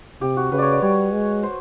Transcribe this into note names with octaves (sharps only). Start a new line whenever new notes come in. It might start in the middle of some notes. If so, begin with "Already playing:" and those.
C3 G4
F#4
C#3 B4
C#5 D5
D5
G3 C#5
G#3
C5